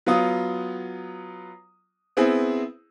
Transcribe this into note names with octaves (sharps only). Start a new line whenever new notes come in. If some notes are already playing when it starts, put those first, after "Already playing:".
F#3 B3 F4 D#6
B3 C4 E4 G#4